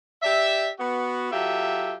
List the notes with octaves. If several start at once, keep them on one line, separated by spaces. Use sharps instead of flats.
G4 D5 E5
B3 F#4
F#3 F4 G4 A4 E5